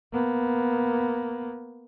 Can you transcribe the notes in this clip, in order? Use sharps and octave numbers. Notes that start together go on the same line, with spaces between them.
A#3 B3